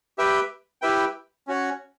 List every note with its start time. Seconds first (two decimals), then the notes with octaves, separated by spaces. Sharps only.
0.18 G4 B4 E5 G5
0.82 E4 G4 B4 E5 G5
1.47 C#4 F#4 C#5